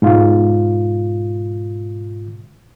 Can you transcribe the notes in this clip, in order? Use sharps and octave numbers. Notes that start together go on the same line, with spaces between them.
G#2 B2 F4